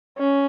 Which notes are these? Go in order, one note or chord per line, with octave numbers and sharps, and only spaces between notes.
C#4